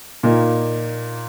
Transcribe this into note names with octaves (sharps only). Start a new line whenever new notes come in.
A#2 A#3 D#4